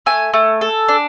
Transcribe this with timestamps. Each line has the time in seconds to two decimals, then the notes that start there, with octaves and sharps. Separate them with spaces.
0.06 A3 G#5
0.34 A3
0.61 A4
0.88 D4